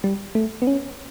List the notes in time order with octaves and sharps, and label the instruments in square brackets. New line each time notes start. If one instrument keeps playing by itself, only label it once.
[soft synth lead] G3
A3
B3
C#4